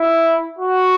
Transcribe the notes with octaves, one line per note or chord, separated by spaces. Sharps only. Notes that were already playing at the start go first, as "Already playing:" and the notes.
Already playing: E4
F#4